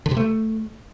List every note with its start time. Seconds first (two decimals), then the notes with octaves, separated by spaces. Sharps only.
0.06 D3
0.11 C3
0.17 A3